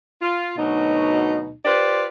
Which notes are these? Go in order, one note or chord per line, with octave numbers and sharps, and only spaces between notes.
F4
D2 B2 F#3 D#4
F4 G4 B4 C5 D5